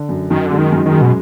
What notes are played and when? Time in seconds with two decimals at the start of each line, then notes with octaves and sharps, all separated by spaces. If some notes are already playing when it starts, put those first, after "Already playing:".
Already playing: D3
0.09 F#2
0.30 F#2 D#3
0.46 D3 G#3
0.58 D#3
0.72 F#2
0.86 D#3
0.92 G#3
1.02 B2